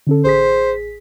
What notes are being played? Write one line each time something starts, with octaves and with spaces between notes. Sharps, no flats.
D3 C#4 A4
A1 G#4 C5 B6